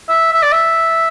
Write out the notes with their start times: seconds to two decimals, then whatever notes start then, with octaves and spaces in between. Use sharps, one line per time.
0.09 E5
0.32 E5
0.43 D5
0.53 E5